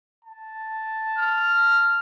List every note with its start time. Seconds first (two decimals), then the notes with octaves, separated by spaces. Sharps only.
0.25 A5
1.18 F6